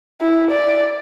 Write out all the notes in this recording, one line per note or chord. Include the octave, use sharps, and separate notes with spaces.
E4
D5